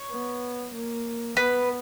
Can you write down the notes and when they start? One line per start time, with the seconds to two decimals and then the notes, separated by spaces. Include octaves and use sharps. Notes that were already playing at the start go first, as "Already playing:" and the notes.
Already playing: C#5
0.12 B3
0.75 A#3
1.37 B3 B4